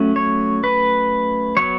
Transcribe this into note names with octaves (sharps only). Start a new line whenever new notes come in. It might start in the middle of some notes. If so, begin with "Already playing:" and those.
Already playing: F#3 A3 C#4
C#5
B4
F#3 B3 C#5